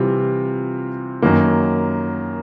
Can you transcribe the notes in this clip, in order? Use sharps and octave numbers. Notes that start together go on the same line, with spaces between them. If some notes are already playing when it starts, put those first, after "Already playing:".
Already playing: C3 E3 G3 C4 F4
F#2 D#3 F#3 A#3